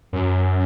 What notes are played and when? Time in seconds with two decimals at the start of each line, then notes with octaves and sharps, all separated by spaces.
0.13 F#2